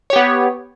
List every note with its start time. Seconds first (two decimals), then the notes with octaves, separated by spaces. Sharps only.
0.10 C#5
0.13 G4
0.16 B3